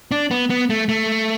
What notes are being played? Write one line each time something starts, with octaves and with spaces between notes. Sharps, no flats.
D4
B3
B3
A3
A3